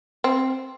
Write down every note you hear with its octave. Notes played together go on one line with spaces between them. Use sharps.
C4